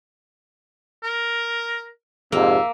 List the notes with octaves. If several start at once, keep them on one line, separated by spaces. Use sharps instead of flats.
A#4
F2 G#2 C3 A#3 E5